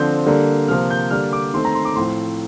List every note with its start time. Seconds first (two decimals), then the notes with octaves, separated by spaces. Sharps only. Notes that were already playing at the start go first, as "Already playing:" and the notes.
Already playing: D3 F3 C4 G6
0.26 D3 G3 A#3
0.68 C3 F3 A#3 F6
0.90 G6
1.11 D3 G3 A#3 F6
1.33 D6
1.54 D#3 A3 C4 C6
1.65 A#5
1.75 C6
1.85 D6
1.96 A2 F3 C4 C6